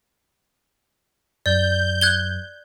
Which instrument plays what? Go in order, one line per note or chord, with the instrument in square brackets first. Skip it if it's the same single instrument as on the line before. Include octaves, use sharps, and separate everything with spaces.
[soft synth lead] F#2 [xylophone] D5 [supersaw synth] G6
[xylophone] F#6 G#6 G7